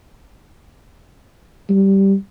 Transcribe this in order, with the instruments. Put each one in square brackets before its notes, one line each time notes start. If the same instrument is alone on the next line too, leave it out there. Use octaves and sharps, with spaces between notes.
[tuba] G3